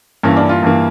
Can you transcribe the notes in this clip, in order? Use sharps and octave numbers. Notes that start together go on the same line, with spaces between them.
G2 E3 A#3 C#4
D4
F4
G2 E3 A#3